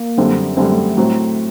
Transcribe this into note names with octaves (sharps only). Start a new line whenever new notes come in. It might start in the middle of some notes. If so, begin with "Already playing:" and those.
Already playing: A#3
F#2 D3 G3 C4
F#2 D3 G3 A3 C4
A3
A3
A2 F#3 C4